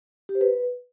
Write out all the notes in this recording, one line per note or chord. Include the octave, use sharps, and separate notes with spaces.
G4
C5
B4